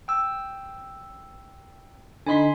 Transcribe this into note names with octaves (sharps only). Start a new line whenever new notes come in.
G5 E6
D3 D#4 G#5 B5 C6 B6